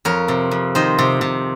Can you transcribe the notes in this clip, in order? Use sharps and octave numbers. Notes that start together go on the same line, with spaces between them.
F2 A#4 C#5
C3
F2
D#3 C5 D#5
C3
C3